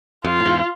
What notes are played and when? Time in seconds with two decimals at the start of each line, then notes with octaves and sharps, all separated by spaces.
0.25 F2 F4
0.40 A2
0.45 E2 G#2